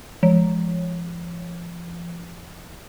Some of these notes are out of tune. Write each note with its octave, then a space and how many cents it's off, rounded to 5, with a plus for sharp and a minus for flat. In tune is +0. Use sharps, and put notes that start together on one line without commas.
F3 -30